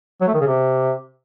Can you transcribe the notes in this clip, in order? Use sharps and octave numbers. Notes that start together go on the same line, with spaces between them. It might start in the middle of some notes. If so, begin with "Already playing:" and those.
F#3
A3
D#3
C#3
C3